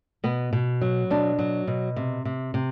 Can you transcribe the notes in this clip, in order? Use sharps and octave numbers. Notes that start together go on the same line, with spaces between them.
B2 B3
B2
F#3
B2 D4
F#3
B2
C3
C3
C3